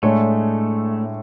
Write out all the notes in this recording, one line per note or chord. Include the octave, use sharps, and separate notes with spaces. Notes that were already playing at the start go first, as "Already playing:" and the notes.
A2 G#3 A3 D4 G#4 C#5